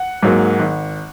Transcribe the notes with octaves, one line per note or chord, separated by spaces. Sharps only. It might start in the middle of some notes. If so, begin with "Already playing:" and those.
Already playing: F#5
G#2 F#3 A#3
G#1